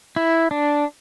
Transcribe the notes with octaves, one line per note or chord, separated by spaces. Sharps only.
E4
D4